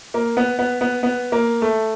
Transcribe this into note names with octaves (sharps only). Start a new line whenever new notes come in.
A#3
B3
B3
B3
B3
A#3
A3